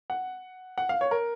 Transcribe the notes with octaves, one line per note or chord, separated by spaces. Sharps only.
F#5
F#5
F5
C#5
A#4